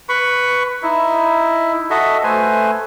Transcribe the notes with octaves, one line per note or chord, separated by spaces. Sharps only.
B4 B5 C#6
D#4 E4
F#4 A4 D#5 E5
A3 B4 C5 G#5